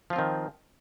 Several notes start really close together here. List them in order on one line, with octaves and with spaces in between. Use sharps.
F3 F4 C4 D#3